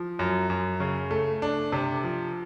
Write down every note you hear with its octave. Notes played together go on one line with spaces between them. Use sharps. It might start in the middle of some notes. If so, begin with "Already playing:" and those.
Already playing: F3
F#2
F#2
C#3
A3
D4
C3
F3